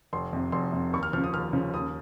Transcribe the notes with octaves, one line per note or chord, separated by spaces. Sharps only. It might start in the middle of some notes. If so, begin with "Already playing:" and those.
F1 C6
F2 C3
F1 C6
F2 C3
D#2 C#6
F6
C#3 F3 F6
D#6
D#2 F6
C#3 F3
D#2 D#6